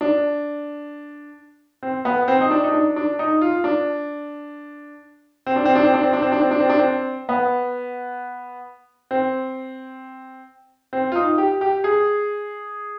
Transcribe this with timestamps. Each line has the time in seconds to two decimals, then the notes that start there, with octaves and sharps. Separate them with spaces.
0.01 D4
1.83 C4
2.05 B3
2.28 C4
2.41 D#4
2.51 D4
2.64 D#4
2.73 D4
2.96 D4
3.19 D#4
3.41 F4
3.64 D4
5.46 C4
5.56 D4
5.65 C4
5.75 D4
5.84 C4
5.94 D4
6.03 C4
6.13 D4
6.22 C4
6.32 D4
6.41 C4
6.51 D4
6.60 C4
6.69 D4
6.79 C4
7.29 B3
9.11 C4
10.93 C4
11.12 F4
11.15 D#4
11.38 G4
11.61 G4
11.84 G#4